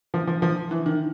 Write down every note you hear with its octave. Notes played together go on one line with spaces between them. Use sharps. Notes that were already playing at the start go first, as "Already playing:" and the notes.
F3
F3
F3
E3
D#3